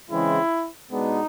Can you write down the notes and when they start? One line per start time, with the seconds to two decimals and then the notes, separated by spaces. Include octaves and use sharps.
0.11 C#3 E3 G#3 C4 E4
0.92 B2 G#3 B3 D4 D#4